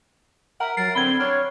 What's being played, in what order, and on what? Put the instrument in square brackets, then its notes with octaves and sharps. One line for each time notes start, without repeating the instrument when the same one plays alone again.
[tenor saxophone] A#4 [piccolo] E5 [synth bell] F#5 A#5
[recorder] F#3 [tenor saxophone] A#4 [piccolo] A6 [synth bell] C7
[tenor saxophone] D3 [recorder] C4 [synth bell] B5 G#6 [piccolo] G7
[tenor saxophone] D4 [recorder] C#5 [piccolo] F6